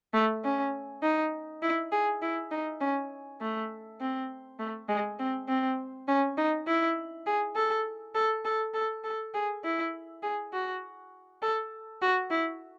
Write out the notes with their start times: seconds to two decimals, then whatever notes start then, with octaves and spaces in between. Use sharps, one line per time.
0.13 A3
0.44 C#4
1.03 D#4
1.63 E4
1.92 G#4
2.22 E4
2.51 D#4
2.81 C#4
3.41 A3
4.00 C4
4.59 A3
4.89 G#3
5.19 C4
5.48 C4
6.08 C#4
6.37 D#4
6.67 E4
7.26 G#4
7.56 A4
8.15 A4
8.45 A4
8.74 A4
9.04 A4
9.34 G#4
9.64 E4
10.23 G#4
10.53 F#4
11.42 A4
12.02 F#4
12.31 E4